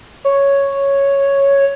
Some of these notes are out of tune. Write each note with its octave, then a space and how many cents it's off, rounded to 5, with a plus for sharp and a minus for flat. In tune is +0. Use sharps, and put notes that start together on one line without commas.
C#5 +0